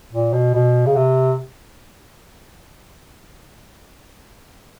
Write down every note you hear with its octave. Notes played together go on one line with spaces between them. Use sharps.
A#2
B2
B2
C#3
C3